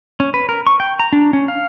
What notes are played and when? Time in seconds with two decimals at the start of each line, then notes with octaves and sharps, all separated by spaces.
0.20 C#4
0.34 B4
0.49 A#4
0.67 C#6
0.80 G5
0.99 A#5
1.13 D4
1.33 C#4
1.48 F5